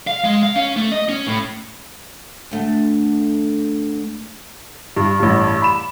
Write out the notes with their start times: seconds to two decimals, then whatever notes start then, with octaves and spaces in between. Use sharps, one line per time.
0.07 F5
0.24 G#3
0.43 F5
0.56 C#4
0.76 A3
0.92 D#5
1.09 C#4
1.27 A2
2.51 D2 A3
4.97 G2
5.20 A1 G2
5.62 B5 E7